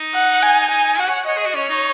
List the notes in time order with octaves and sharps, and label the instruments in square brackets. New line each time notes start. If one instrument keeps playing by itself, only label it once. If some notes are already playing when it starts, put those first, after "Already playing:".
Already playing: [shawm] D#4
[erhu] F#5
G#5
G#5
[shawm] F#4 [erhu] F#5
[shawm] C#5
[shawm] C#5 [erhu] D#5
[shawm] G#4
F#4
[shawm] C#4 [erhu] C#5
[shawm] D#4